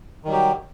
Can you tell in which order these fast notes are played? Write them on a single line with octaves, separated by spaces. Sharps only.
D#3 G3 F#3 G4